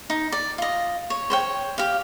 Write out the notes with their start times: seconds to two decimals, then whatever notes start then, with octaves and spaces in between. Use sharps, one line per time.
0.10 D#4
0.32 D5
0.58 F4 D#5
1.10 C#5
1.30 C5 C#5 G5
1.78 G4 F5